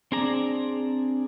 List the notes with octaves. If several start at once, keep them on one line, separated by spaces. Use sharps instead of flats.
C4 D4 G#4 D5 A#5